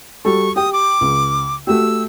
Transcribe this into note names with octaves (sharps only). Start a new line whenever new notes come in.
G3 F#4 A4 C#6
G4 G5 D#6
D6
C#2
A3 F#4 G4 E6